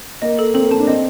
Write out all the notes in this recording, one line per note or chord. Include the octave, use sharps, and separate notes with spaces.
A#3 D#5
A4
C4 A4
A#3
C4 A5
D4
C4 D#5